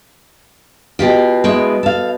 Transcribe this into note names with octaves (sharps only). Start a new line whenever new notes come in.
B2 F4 G4 G5
G#3 B3 E4 G5 C#6
A4 F5